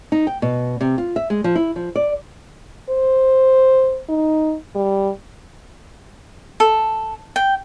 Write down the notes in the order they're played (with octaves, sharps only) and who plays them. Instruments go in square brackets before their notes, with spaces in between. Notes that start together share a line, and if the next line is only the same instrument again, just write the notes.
[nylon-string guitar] D#4
G5
B2
C3
F4
E5
G#3
F3
E4
F3
D5
[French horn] C5
D#4
G3
[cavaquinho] A4
G5